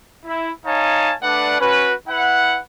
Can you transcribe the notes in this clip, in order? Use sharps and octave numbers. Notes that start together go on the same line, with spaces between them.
E4
D#4 C#5 F5 G#5 A5
A3 D4 B4 D5 F#5
C#4 F#4 B4
E4 B4 F#5